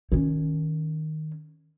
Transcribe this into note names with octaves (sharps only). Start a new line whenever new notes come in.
D#3 C#4